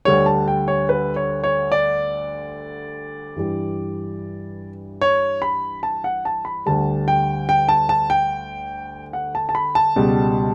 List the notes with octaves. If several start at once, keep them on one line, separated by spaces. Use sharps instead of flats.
D2 D3 G3 C#5
A5
G5
C#5
B4
C#5
C#5
D5
G2 E3 G3
C#5
B5
A5
F#5
A5
B5
D2 D3 G3 A5
G5
G5
A5
A5
G5
F#5
A5
A5
B5
A5
C#2 B2 G3